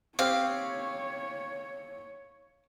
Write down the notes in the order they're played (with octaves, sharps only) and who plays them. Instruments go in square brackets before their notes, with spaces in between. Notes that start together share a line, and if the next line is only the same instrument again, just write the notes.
[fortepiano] C4 G4 [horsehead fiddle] C#5 [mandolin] F5